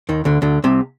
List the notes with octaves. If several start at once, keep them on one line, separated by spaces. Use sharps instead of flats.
D#2 D#3
D2 D3
D2 D3
C2 C3